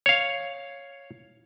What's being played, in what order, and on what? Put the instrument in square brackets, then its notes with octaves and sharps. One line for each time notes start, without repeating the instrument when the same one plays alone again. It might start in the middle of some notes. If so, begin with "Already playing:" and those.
[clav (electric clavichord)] C#5 F5